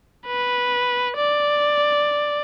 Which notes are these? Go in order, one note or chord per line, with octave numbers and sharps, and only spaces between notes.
B4
D5